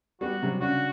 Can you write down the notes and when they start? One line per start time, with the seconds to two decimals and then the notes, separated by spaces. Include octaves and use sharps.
0.21 G3 B3 F#4
0.42 C3 F#3 G3
0.61 C#3 D4 F#4